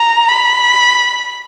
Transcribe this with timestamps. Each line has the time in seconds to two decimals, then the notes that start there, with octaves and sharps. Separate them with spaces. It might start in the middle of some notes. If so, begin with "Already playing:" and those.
Already playing: A#5
0.29 B5